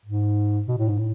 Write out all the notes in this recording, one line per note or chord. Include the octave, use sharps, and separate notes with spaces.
G#2
B2
A2
G#2
A2